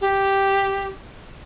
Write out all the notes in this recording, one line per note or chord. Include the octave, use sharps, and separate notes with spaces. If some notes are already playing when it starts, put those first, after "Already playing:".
G4